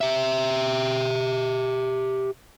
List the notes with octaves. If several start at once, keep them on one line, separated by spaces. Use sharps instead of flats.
G4 E5